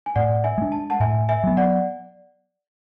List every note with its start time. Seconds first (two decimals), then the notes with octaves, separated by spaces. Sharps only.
0.06 G#5
0.16 A2 D5 F#5
0.44 E5 G#5
0.58 G#3 D4
0.72 A5
0.90 F#5 A5
1.00 A2 E5 G#5
1.29 E5 G#5
1.44 F#3 B3
1.57 D5 F#5